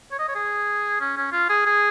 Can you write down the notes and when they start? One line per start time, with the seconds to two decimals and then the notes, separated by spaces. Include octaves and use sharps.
0.12 C#5
0.19 D#5
0.28 C#5
0.35 G#4
1.01 C#4
1.17 C#4
1.32 F4
1.50 G#4
1.66 G#4